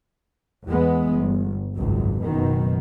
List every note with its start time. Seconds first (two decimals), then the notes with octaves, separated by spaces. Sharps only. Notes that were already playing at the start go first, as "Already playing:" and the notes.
0.66 E2 E3 G#3 B3
1.13 G1
1.76 G#1 C#2 F#2
2.22 F#1 F#2 B2 D#3